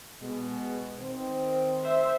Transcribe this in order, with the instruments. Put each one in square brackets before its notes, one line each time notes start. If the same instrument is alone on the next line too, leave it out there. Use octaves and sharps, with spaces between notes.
[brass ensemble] B2 G#3
D#3 C4
[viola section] C5 E5